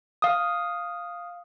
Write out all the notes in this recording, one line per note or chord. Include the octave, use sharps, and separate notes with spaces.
F5 D#6